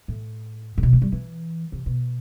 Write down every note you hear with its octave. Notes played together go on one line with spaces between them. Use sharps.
A2
A2
B2
A3
G3
E3
C3
B2